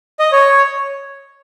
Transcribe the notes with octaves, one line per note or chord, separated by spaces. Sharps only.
D#5
C#5